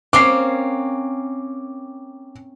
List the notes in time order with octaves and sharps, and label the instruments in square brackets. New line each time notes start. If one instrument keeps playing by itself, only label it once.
[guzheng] A#3 C4 C#4 [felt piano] D6 C7